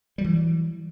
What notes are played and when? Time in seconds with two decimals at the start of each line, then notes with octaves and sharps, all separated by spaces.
0.18 G3
0.21 F#3
0.24 E3